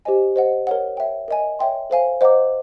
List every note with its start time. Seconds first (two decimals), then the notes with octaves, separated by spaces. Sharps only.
0.05 G4 C5 D#5 G#5
0.36 C5 D#5 F#5
0.67 A#4 C#5 F#5
0.97 C#5 E5 G5
1.28 A#4 D#5 G#5
1.59 C#5 E5 G5 C6
1.90 A4 C5 F5 G#5
2.21 C5 D#5 F#5 A#5 D6